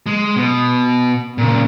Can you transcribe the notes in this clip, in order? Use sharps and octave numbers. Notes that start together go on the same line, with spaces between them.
G#3
B2
A#2 C#3